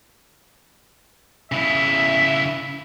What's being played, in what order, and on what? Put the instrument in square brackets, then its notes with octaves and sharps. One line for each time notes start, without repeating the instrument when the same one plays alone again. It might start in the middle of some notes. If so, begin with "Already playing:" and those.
[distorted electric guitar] C#3 E4 [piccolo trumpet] E5